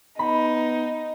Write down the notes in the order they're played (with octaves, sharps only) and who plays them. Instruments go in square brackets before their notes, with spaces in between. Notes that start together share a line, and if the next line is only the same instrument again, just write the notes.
[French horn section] B3 [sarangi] D#4 [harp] B5